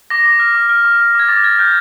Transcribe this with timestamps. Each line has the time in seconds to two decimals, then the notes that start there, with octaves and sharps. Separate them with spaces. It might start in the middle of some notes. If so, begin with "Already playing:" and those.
0.10 D6 A#6
0.26 D6
0.40 F6
0.54 D6
0.69 F6
0.85 D6
1.00 F6
1.15 D6 G#6
1.29 D6 A6
1.44 F6 G#6
1.59 F6 G6